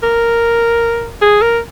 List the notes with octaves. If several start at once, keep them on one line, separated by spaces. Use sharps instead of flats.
A#4
G#4
A#4